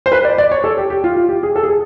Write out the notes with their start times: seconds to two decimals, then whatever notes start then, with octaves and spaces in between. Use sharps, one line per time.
0.06 C5
0.12 B4
0.24 D5
0.38 D5
0.51 C#5
0.64 A4
0.78 G4
0.90 G4
1.04 F4
1.16 F4
1.29 G4
1.43 G#4
1.56 A4
1.63 G#4